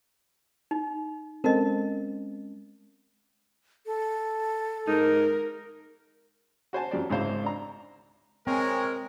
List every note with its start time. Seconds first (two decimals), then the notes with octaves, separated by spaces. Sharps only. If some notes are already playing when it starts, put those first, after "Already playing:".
0.71 D#4
1.44 G#3 C4 C#4 A4 A#4 D#5 A5
3.86 A4
4.87 G#2 D#4 A#4
6.73 F#4 C5 G#5 A5
6.91 F2 F#3 G4 D5
7.10 G#1 C#2 G#2 E4 C5 F5
7.43 D4 A#5
8.47 G#3 C4 A#4 C#5 G5 G#5